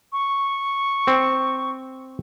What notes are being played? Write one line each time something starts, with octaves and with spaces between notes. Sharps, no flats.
C#6
C4